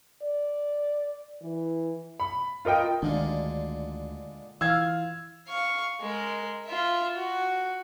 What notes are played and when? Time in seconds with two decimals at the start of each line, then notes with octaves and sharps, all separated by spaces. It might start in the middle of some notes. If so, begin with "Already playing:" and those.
0.22 D5
1.42 E3
2.20 B5
2.65 F4 A#4 D#5 G5
3.02 D2 A#2 D3 D#3 G#3 D4
4.61 E3 F4 F5 E6 G#6
5.47 F5 C#6
6.01 G#3 A#4
6.66 F4 E5
7.16 F#4